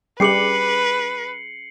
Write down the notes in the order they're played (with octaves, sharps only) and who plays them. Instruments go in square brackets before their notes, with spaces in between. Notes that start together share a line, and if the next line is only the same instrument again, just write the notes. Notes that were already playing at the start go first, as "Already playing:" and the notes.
[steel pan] G3 [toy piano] C#4 G#4 D6 [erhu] B4 [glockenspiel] C7 C#7 F#7